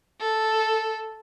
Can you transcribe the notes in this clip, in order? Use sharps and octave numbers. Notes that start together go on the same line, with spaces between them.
A4